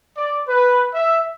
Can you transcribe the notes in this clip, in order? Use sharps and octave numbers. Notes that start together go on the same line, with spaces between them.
D5
B4
E5